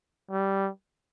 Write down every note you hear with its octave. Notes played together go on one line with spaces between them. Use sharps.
G3